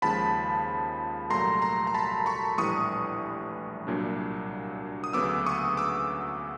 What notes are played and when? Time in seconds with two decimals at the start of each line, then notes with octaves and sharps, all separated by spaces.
0.02 D#2 C#3 F3 G#3 A5 B5
1.30 C2 A#2 F#3 A3 A#5 C6
1.62 A#5 C6
1.87 A#5
1.94 A5 B5
2.26 B5 C#6
2.58 A#1 A2 E3 G3 C#6 D#6
3.87 C2 A#2 F#3 A#3 D4
5.04 D#6
5.13 D2 C#3 F#3 B3 D6 E6
5.46 C#6 D#6
5.77 D6 E6